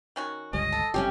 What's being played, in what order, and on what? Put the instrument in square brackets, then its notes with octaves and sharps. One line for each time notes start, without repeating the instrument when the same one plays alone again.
[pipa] D#3 C#4 F#4
[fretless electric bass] G1 C#2 G3 [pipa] C#4 [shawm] D#5
[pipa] A4
[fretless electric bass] F#1 G3 [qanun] C3 C#4 G4